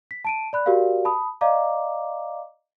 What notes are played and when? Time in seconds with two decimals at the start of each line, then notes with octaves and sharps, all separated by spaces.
0.11 B6
0.25 A5 D7 D#7
0.53 D5 B5 F#6
0.66 F#4 G4 A#4 D5 F5
1.05 A5 B5 D#6
1.41 D5 D#5 F5 A#5 D6